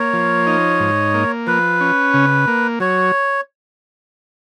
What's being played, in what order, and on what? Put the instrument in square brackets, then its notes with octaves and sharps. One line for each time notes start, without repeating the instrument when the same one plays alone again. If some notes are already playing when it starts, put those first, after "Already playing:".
Already playing: [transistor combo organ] A#3 [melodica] C#5
[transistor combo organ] F3
D#4
G#2
A#3
[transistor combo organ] F3 [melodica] B4
[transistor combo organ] C#4
C#3
A#3
[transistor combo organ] F#3 [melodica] C#5